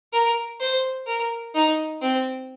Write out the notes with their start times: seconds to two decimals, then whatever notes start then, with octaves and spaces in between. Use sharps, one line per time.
0.13 A#4
0.60 C5
1.07 A#4
1.55 D#4
2.01 C4